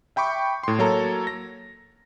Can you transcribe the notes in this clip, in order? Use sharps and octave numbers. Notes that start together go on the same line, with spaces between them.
E5 G5 B5 C#6 D6
A2 C6
F#3 A#3 A4 C#5 A5 A#5
A#6